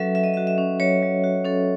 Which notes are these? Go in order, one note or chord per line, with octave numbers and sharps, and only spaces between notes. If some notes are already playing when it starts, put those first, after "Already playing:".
Already playing: F#3 C#4 F#4 A4 B4 E5
F#3 E5
D#5
F#4 E5
E5
C#4
F#3 C#5
F#3
F#4
C#4 A4